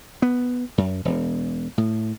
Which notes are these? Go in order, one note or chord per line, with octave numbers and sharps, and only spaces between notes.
B3
F#2
E1
A2